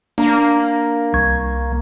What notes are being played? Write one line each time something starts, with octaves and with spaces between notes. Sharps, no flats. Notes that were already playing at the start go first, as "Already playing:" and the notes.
A#3 D4 A#5
C2 C#6 G#6